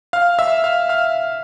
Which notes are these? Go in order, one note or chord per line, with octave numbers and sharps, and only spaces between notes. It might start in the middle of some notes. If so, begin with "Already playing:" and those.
F5 F6
E5 E6
F5 F6
F5 F6